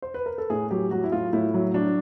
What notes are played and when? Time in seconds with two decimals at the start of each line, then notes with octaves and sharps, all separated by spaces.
0.02 C5
0.14 B4
0.26 A#4
0.38 A4
0.50 A2 G#4
0.71 F#3 G4
0.91 F#3 F#4
1.04 E4
1.12 A2 F4
1.33 A2 E4
1.54 F#3
1.74 F#3 D4